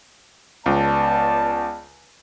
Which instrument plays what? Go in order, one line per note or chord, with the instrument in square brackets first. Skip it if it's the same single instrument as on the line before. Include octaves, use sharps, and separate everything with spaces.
[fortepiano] C#2 [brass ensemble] B3 D5 A5